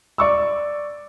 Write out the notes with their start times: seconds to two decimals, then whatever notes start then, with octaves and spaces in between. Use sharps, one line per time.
0.18 D5 C#6 E6